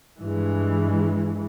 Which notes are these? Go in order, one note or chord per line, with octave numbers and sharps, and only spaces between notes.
G2 E3 G#3